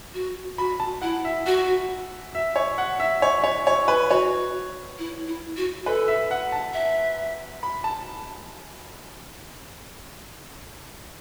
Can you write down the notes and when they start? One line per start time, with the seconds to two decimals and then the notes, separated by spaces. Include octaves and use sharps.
0.14 F#4
0.58 F#4 B5
0.80 A5
1.02 E4 F#5
1.25 E5
1.46 F#4 F#5
2.35 E5
2.56 C#5
2.78 F#5
3.00 E5
3.22 C#5
3.44 C#5
3.67 C#5
3.88 B4
4.10 F#4 C#5
4.99 E4
5.28 E4
5.57 F#4
5.86 A4 B4
6.08 E5
6.31 F#5
6.52 A5
6.74 E5
7.63 B5
7.84 A5